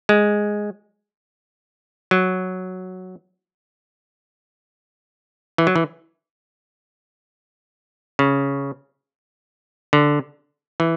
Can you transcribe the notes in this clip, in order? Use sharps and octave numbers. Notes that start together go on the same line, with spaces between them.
G#3
F#3
E3
F#3
E3
C#3
D3
E3